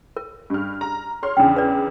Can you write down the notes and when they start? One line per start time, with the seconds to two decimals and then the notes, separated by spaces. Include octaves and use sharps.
0.17 A#4
0.50 G2 F6
0.81 A#5
1.23 C#5 C6 F6
1.37 E2 C#3 D4 G5
1.56 B4 D5